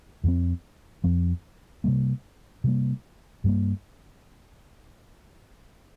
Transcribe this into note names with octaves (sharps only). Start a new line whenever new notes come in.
F2 F3 C4
F2 F3 C4
C3 G3 A#3
C3 G3 A#3
G2 G3 A#3